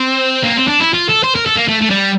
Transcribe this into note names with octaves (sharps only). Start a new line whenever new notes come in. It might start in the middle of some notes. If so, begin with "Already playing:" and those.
Already playing: C4
A#3
C4
D4
E4
F4
A4
C5
A#4
A4
A#3
A3
A3
G3